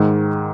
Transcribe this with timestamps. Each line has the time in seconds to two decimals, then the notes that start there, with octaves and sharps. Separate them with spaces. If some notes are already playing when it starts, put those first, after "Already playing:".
Already playing: G#2 D#3 G#3